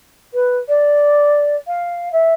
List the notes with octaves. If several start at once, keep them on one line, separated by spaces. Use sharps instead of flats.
B4
D5
F5
E5